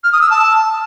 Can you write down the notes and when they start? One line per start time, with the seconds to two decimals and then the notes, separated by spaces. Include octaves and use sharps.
0.03 F6
0.12 D#6
0.21 E6
0.30 A5